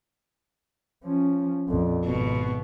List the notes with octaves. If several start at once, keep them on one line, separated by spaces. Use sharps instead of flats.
F3 C#4
A#1 F2
G#1 B2